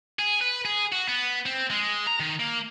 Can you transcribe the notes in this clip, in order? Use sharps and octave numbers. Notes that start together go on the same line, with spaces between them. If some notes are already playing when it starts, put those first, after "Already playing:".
G#4
B4
G#4
F#4
B3
C4
G#3
A#5
D#3
A#3